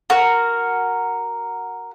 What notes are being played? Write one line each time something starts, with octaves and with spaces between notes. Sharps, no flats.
F#4 A#4